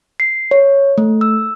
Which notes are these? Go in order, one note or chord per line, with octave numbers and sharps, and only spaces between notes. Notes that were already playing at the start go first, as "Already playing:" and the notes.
C7
C#5
A3
E6